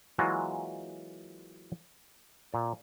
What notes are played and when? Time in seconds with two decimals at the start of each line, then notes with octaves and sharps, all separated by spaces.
0.18 E3 F#3 G#3 A#3 F4 F#4
2.52 A#2 D5